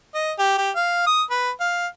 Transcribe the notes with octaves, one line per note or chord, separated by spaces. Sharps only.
D#5
G4
G4
F5
D#6
B4
F5